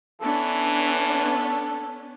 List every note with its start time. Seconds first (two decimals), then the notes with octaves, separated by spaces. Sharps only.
0.21 E3 B3 C#4 D4 A4